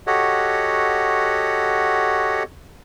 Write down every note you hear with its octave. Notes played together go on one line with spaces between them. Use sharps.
F#4 G4 A4 C#5 D#5 F#5